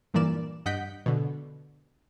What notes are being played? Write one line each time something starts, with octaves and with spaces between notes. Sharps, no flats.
G2 A#2 E3 A#4 D5 E7
G2 D#5 F#5 G6 B6 D7
B2 D3